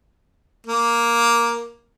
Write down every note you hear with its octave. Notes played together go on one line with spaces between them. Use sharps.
A#3